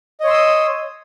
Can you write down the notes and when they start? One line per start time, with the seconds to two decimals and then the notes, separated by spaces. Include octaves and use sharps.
0.20 D#5
0.23 C#5
0.27 C6
0.30 E6
0.34 D#6